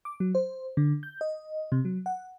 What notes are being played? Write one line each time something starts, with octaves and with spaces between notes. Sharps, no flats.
D6
F#3
C5
D3
G6
D#5
C3
F#3
F#5